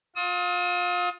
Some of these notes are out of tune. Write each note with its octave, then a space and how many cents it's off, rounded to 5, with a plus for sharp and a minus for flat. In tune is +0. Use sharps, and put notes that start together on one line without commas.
F4 +30 D#6 +40